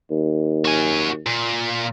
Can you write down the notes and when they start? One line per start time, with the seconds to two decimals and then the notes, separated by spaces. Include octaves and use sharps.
0.11 D#2
0.65 F#4 G#5
1.26 A#2